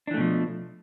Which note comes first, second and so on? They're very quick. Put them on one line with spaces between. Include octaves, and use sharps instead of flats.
D4 E3 A3 B2 F3